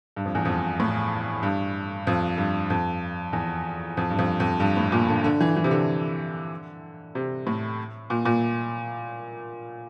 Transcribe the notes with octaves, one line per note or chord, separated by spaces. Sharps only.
G2
F2
E2
F2
A2
G2
F2
G2
F2
E2
F2
G2
F2
F2
G2
A2
A#2
D3
D3
E3
E3
C3
D3
C3
A2
A#2
A#2